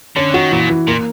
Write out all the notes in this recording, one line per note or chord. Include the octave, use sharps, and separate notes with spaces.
D3 C#4
D#3 F#4
A#2 E3
E3
A#2 A#3